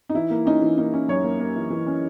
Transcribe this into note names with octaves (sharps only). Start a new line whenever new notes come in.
D#4
E3 E4
A#3
C#4 D#4
E3
A#3 D#4
C#4
F#2 C#5
A#3
A#3
E3
E3
C#4